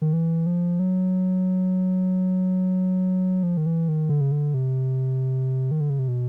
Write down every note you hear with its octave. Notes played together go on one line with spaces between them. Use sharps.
D#3
E3
F3
F#3
F3
D#3
E3
D#3
D3
C#3
D3
C3
D#3
D3
C#3
C3
B2